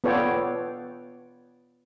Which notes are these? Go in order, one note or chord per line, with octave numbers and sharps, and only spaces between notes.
B3 F4 A4 C#5 D5 G5